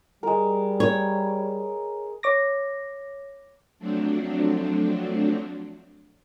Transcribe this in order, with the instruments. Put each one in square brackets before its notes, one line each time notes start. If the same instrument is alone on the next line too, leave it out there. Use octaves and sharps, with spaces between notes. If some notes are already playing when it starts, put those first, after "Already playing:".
[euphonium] G3 [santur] G#3 A#4
[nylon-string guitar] C#5
[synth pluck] C#5 D6 A#6
[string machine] F3 F#3 A3 C4 D4